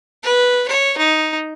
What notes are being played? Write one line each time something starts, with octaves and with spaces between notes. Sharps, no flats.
B4
C#5
D#4